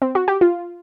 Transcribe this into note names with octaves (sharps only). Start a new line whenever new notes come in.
C4
F#4
G4
F4